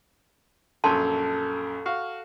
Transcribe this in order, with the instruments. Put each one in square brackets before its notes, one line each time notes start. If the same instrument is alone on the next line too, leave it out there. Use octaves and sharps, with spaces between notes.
[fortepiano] A#1 F#2 [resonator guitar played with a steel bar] A4 [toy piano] A5 C6
[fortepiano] F#4 F5